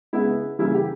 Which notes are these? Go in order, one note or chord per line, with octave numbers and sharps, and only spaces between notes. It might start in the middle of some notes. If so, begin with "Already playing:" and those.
C#3 G#3 B3 E4
C#3 E3 G3 A#3 E4
G4